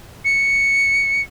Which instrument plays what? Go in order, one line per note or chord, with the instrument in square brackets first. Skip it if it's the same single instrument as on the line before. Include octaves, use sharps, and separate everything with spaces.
[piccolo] C#7